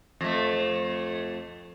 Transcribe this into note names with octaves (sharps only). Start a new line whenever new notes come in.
F2 A3